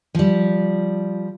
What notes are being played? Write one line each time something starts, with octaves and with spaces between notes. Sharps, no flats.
F3 G3